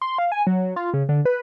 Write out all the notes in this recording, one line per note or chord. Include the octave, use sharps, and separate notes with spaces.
C6
F5
G#5
F#3
F4
C#3
D3
B4